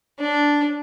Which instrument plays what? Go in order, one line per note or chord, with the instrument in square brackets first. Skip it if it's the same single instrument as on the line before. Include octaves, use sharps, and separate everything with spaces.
[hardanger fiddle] D4